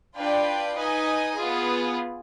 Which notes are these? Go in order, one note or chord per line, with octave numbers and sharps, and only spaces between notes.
D4 F4 B4 D5 G5
D#4 B4 D#5 G#5
B3 F4 G#4